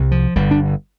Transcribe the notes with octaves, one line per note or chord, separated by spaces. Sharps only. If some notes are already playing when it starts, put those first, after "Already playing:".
Already playing: C2 C3
F3
G1 G2 D3 G3
D4